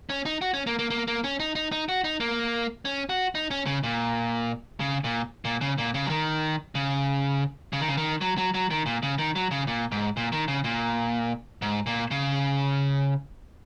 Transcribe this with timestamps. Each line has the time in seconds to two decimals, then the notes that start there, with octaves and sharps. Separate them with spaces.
0.09 C#4
0.25 D#4
0.42 F#4
0.54 C#4
0.67 A#3
0.79 A#3
0.90 A#3
1.08 A#3
1.24 C#4
1.40 D#4
1.55 D#4
1.72 D#4
1.89 F#4
2.04 D#4
2.20 A#3
2.85 C#4
3.09 F#4
3.35 D#4
3.51 C#4
3.66 C#3
3.83 A#2
4.80 C#3
5.04 A#2
5.45 A#2
5.61 C#3
5.78 A#2
5.94 C#3
6.06 F#3
6.10 D#3
6.75 C#3
7.73 C#3
7.81 D#3
7.88 C#3
7.98 D#3
8.21 F#3
8.38 F#3
8.54 F#3
8.71 D#3
8.86 A#2
9.03 C#3
9.19 D#3
9.36 F#3
9.51 C#3
9.67 A#2
9.92 G#2
10.17 A#2
10.32 D#3
10.48 C#3
10.64 A#2
11.62 G#2
11.86 A#2
12.11 C#3